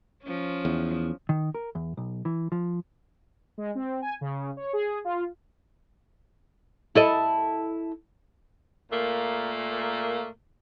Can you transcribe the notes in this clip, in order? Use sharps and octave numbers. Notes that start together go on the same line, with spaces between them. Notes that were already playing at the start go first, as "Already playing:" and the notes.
F3 C#4
E2
D#3
A#4
E2
B1
E3
F3
G#3
C4
G#5
C#3
C#5
G#4
F4
E4 A4 D#5
A#2 A3 A#3